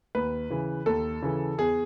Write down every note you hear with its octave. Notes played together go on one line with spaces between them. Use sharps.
D#2 B4
C#3 E3
D#2 A4
C#3 E3
E2 G#4